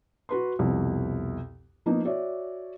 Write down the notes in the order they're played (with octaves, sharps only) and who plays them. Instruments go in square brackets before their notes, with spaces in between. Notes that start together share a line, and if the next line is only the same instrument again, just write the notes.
[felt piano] F#4 B4 C6
C2 F2 B2
F3 A#3 B3 D#4
F#4 C#5 D5 E5